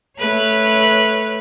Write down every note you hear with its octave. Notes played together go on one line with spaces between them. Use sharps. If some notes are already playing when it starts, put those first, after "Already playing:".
A3 B4 C#5